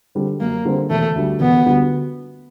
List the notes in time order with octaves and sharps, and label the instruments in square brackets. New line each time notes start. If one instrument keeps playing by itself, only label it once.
[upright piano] D3 G3 C4
[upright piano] F#2 [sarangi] A#3
[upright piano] D3 G3 C4
[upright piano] E1 [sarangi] A3
[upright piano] D2 D3 G3
[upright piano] E1 [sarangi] B3
[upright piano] D2 D3 G3